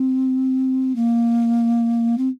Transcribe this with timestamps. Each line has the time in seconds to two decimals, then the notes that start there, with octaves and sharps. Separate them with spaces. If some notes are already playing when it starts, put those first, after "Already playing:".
Already playing: C4
0.95 A#3
2.17 C4